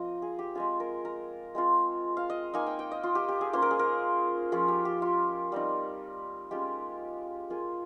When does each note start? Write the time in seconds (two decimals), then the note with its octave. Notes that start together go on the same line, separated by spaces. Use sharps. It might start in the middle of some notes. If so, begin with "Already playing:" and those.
Already playing: F3 A#3 C4 D#5
0.22 G#4
0.39 G4
0.55 G#3 C4 F4 G#4
0.80 A#4
1.05 A#4
1.55 G#3 C4 F4
2.17 F5
2.30 D#5
2.54 A#3 D#4 G#5
2.67 G5
2.79 G5
2.92 D#5
3.03 F4
3.15 G4
3.28 G4
3.41 G#4
3.53 A#3 C#4 F4 C5
3.62 A#4
3.71 G#4
3.79 A#4
4.52 F3 A#3 C#4 F4 G#4
4.68 G4
4.85 G4
5.02 F4
5.52 G3 C4 D#4
6.51 G#3 C#4 F4 G4
7.50 A#3 F4 G#4